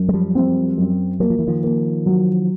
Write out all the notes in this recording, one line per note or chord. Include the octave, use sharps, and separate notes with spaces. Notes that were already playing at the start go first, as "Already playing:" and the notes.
Already playing: F#2
G#3
F3 G3
C4
F#2
F#3 A#3
F3
E3
D#3 F3
A#3
F#3